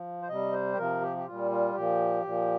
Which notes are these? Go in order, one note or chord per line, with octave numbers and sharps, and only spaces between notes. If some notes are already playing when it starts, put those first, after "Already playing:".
Already playing: F3
C5
C3 G3 D#5
C5
G4
C3 F3 A#4
G4
G4
A#2 G3 F4
F4
A#2 F3 G4
A#2 F3